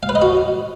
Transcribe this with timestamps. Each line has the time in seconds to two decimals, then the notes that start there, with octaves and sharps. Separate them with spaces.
0.03 F5
0.09 B4
0.15 D#5
0.22 F#4